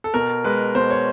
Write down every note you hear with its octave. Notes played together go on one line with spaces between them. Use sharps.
A4
B2 A#4
G#3 B4
B2 C5
C#5